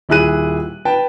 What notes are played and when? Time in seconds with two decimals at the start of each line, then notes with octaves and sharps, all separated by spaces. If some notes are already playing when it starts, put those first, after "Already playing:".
0.09 D#1 E4 G#4 F#6 D#7
0.85 B4 G5 A5